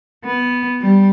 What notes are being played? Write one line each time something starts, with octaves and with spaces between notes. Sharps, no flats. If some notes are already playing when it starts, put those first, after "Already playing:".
B3
G3